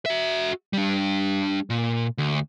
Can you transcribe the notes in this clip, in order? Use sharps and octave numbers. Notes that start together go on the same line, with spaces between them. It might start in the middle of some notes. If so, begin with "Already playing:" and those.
F#4 E5
G3 D4
A#2
D2